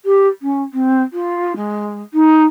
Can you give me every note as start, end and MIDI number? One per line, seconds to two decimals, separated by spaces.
0.05 0.27 67
0.42 0.62 61
0.73 1.02 60
1.13 1.53 65
1.56 2.01 56
2.14 2.45 63